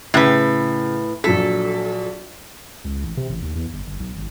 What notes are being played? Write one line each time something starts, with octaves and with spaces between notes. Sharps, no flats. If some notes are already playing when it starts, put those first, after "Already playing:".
A2 C#3 B4
A#1 F#3 A4 B6
C#2
A1
C3
A1
D#2
E2
G1
G1
B1
G#1